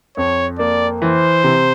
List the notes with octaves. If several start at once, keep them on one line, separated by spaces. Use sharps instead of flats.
F2 C#5
A#3 D5
E3 C5
C3